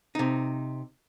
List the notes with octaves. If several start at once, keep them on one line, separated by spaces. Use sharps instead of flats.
C3 D#4